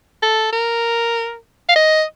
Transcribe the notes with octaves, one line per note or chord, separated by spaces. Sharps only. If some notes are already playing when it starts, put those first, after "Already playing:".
A4
A#4
F5
D#5